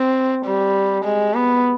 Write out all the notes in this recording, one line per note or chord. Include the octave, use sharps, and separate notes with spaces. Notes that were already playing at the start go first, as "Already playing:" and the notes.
Already playing: C4
G3
G#3
B3